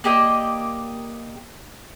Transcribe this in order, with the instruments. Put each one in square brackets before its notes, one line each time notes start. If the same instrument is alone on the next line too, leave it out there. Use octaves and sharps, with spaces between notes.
[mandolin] A#3 G4 D5 D#5